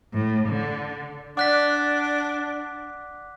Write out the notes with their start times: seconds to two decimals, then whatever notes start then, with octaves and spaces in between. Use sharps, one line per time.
0.13 A2
0.49 D3
1.37 D4 D5 F#5 D6 F#6 B6